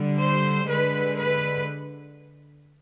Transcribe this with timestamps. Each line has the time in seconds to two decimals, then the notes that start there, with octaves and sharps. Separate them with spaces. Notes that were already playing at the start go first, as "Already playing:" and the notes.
Already playing: D3 G3
0.21 C5
0.69 D3 G#3 B4
1.17 B4